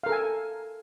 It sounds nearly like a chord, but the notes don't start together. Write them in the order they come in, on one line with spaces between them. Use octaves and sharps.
F5 A#4 A4 G#5